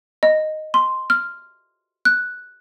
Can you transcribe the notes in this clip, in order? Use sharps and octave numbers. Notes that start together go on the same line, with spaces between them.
D#5
C6
F6
F#6